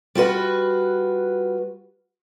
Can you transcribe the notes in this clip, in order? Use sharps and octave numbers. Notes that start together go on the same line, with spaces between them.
G3 F4 F#4 B4